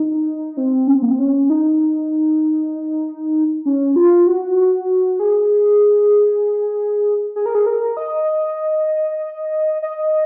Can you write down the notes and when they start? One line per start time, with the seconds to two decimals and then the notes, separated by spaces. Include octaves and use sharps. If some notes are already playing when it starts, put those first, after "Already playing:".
Already playing: D#4
0.57 C4
0.87 C#4
0.95 C4
1.02 A#3
1.11 C4
1.19 C#4
1.50 D#4
3.66 C#4
3.96 F4
4.27 F#4
5.20 G#4
7.36 G#4
7.46 A#4
7.55 G#4
7.66 A#4
7.97 D#5
9.82 D#5